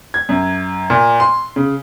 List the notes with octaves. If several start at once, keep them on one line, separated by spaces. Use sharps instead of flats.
G#6
F#2
A#2
C6
C#3